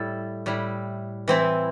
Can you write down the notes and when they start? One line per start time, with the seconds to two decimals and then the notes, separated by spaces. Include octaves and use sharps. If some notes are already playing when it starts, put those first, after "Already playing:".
Already playing: A2 G3 E4 A4
0.46 A2 G3 E4
1.28 E3 C4 E4